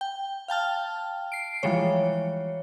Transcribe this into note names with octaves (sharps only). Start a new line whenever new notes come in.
G5
F5 G5 A5 F6
C7 D7
E3 F3 G3 G#3 C#5